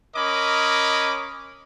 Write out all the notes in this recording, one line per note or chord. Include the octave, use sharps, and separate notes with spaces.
C#4 A#4 D#5 B5 D6